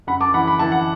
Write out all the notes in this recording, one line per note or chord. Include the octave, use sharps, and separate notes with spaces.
F#2 F#5 B5
A5 D6
E3 F#5 B5
B5
E3 A5
F#5